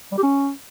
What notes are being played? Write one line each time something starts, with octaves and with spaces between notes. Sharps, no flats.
G3
G4
C#4